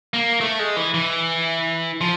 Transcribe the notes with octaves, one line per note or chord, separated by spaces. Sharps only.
A#3
A3
G#3
E3
E3
F3